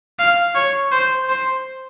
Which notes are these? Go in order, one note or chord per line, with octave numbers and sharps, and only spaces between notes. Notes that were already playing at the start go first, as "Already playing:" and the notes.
F5
C#5
C5
C5